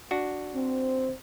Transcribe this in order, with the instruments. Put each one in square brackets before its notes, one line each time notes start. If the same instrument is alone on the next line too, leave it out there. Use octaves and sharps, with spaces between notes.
[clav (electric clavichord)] D4 F#4
[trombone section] C4